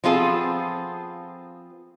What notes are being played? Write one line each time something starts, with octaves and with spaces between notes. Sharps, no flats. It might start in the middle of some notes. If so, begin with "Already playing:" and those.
F3 B3 C4 F4 G#4 A4